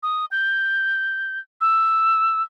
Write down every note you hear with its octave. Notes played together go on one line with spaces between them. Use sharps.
D#6
G6
E6